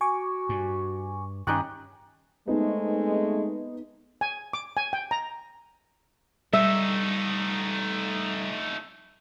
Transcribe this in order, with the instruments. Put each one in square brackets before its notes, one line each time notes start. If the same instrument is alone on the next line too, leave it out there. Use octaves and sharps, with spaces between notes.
[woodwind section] F#4 [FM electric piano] G#5 C#6 D6
[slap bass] G2
[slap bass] G2 D#3 [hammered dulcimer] C#4 D#4 G4 [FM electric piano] C#6 F#6
[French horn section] G#3 A3 C4 [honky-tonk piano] B3 D#4
[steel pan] G#5
D6
G#5
G5
A#5
[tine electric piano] G3 [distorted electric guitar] A3 D#4 [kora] E5